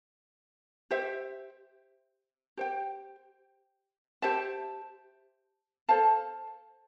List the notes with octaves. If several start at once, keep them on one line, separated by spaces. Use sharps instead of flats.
G4 C5 E5
G4 C5 G5
G4 C5 E5 A5
A4 C5 F5 A5